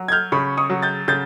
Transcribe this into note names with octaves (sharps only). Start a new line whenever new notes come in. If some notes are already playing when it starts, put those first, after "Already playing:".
Already playing: F#3
G#6
F6 G6
C#3 B5 C#6
C#6 D#6
F#3
G6 A6
C#3 G6 A6